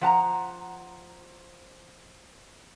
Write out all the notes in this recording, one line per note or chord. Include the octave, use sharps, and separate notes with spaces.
F3 F#5 A5 A#5